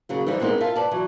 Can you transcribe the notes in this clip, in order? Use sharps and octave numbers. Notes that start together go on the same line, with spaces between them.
C#3 F#3 A#3
E3 F3 G3 D#4 E4
G3 G#3 B3 C4 D#4 A#4
F4 A#4 E5 A5
B4 D5 A5
E3 F#3